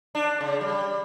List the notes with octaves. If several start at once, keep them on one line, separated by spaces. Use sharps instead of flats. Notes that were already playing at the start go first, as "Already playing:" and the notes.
D4
C#3
G3